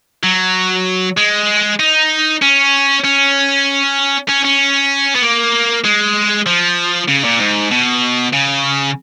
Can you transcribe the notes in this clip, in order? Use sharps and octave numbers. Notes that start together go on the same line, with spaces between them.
F#3
G#3
D#4
C#4
C#4
C#4
C#4
B3
A#3
G#3
F3
C#3
A#2
G#2
B2
C#3